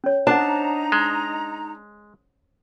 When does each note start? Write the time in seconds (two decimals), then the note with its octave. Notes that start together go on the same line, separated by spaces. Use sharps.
0.04 C#4 C#5
0.27 D4 D#4 C5 F#5 A5 A#5
0.92 G#3